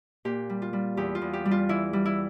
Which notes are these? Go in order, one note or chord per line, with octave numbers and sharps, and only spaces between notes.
A#2 G4
G3
F4
G3
E2 G4
F4
E2
G4
G3
F4
E3 E4
G3
E4